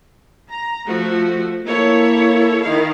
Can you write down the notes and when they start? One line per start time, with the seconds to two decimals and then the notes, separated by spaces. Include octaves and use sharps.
0.50 A#5
0.87 F3 A3 F#4
1.66 A#3 E4 A4 C#5
2.62 D#3 E4 F5